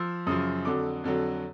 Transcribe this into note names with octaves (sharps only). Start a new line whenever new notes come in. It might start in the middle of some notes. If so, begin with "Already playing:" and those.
Already playing: F3 E6
F#2 C#3 F3 D#6
F2 D3 F#3 D6
F2 D3 F#3